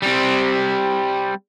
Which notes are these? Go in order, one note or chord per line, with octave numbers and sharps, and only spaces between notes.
G3 C4